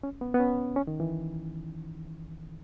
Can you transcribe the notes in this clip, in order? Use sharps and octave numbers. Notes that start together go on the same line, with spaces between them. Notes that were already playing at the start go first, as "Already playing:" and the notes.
C#4
B3
B3
C#4
C#4
D#3
E3